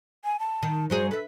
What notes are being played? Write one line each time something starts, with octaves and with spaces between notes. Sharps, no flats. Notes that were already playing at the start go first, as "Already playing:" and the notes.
G#5
A5
D#3
G2 F#3 G#4 C5
A4 B4 E5